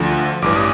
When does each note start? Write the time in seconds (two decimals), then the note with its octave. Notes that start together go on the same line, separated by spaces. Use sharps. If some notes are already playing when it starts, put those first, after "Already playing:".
Already playing: D2 D3 F3
0.42 A1 G2 E3 D6
0.56 D#6